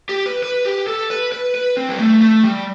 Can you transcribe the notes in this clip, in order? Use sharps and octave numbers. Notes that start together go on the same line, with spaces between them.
G4
B4
B4
G4
A4
B4
B4
B4
C4
G3
A3
A3
G3